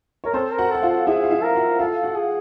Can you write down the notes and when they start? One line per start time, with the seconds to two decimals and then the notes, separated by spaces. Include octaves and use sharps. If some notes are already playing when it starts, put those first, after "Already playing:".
0.24 A#4 C#5
0.33 C4 A4 C5
0.52 A#4
0.58 F#4 F#5
0.70 A4 F#5
0.82 F4 F5
0.89 A4
1.07 E4 G#4 E5
1.24 F5
1.31 E4 E5
1.43 A#4
1.55 F#4 F#5
1.79 F4 A4 F5
2.03 F#4 F#5
2.16 G#4